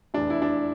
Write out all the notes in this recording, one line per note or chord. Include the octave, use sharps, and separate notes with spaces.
F1 E2 E3 D4
E4
D4